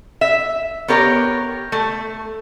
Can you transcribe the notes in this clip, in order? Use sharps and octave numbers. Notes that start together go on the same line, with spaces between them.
E5
B3 G4 A#4 C#5
A3